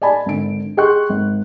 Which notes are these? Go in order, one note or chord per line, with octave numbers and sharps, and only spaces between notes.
D5 D#5 G#5 A5 B5
G#1 D3 D7
G#4 D#5 G5 C6 C#6 F#6
G#1